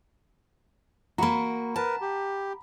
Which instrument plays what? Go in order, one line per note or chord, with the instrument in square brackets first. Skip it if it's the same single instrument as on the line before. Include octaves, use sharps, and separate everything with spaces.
[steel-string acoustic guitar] A#3 F#4 [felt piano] A#5 B5
[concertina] A#4 B4 [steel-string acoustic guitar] A5
[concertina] G4